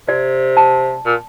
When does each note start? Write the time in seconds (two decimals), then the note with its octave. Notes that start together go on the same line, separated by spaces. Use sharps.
0.08 C3 D5
0.57 A5
1.06 A#2